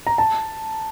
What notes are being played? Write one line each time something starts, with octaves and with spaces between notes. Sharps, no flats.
A#5
A5